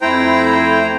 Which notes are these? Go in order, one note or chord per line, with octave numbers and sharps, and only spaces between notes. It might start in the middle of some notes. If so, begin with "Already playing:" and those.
F2 A3 E4 C5 G5 A#5